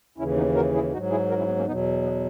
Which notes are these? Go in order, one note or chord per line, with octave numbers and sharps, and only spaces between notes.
D#2 C#3 E3 C#4 E4
B3 D#4
F#4 A#4
E4 G#4
G#2 F#3 D#4 F#4
E4 G#4
F#4 A#4
C#4 E4
B3
A#3 C#4
E2 B2 F#3 B3 D#4
B3